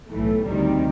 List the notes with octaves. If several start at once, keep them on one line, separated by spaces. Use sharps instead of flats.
B1 A2 E3 A3
D2 C3 D#3 G3